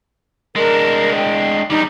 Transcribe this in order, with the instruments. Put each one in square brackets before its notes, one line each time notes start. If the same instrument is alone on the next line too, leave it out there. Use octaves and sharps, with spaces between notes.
[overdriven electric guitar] G#3 D4 [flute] A#4
[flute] G5
[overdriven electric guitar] E2 G3 [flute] D#4